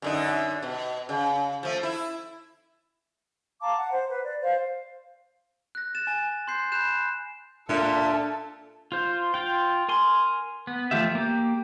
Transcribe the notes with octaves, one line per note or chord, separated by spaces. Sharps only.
F#2 D3 D#4
B2
C#3
F3 A3
E4
F5 A5 A#5 D6
F#5
C5
B4
D5
C5 F5
F#6 A#6
A6 E7
G#5 A6
C6 F#6 G6 C7
B5 F#6 G6 E7
A#2 D4 A4 E5 A5
F4 C5
F4 G5
A#4 G#5 C6
B3
F3 A3 F4 G4 E5
A#3 G4